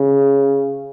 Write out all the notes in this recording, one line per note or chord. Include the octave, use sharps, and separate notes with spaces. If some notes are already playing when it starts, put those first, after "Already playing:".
Already playing: C#3